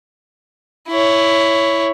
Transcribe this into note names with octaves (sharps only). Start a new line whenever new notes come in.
E4 C#5